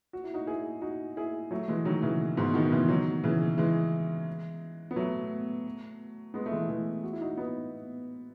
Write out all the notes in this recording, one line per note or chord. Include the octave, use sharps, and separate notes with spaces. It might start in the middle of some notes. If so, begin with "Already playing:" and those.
F#4
E4
D#4 F#4
E4 G#4
D#4 F#4
E4 G#4
F#3 A3
E3 G#3
D#3 F#3
C#3 E3
G#2 B2
B2 D#3
C#3 E3
D#3 F#3
C#3 E3
E3 G#3
B3
F#3 A3
G#3 B3
A3
E3 G#3
E3 G#3
F#4
E4
D#4 F#4
B3 D#4